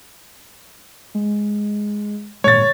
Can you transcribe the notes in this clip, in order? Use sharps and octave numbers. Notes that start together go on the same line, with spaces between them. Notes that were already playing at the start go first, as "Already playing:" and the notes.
G#3
G#1 A#2 G#3 C#5 A6